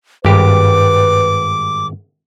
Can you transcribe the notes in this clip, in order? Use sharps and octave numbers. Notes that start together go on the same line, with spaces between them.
G#1 G2 G4 B4 D6